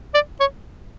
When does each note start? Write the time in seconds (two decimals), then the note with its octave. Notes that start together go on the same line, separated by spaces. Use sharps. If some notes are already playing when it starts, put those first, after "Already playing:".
0.14 D5
0.40 C#5